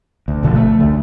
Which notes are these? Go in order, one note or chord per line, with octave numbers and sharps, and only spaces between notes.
D2
G#1 B2 D3 F3
A3
D2 D3